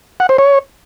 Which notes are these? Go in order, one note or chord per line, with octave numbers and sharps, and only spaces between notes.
F#5
C5
C#5